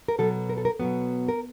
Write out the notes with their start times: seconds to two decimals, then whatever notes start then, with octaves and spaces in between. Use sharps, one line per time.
0.08 A#4
0.18 B2 F#3 B3 A4
0.49 A#4
0.57 A4
0.65 A#4
0.79 B2 F#3 B3
1.28 A#4